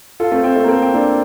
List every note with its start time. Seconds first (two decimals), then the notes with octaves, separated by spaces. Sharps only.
0.20 F4 A4
0.32 A3 C4
0.44 A3 C4
0.56 A3
0.64 A#3
0.68 A3 C4
0.82 C4
0.93 A#3 D4